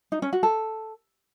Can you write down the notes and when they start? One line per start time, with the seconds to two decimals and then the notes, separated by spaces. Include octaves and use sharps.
0.12 D#4
0.22 C#4
0.33 F#4
0.43 A4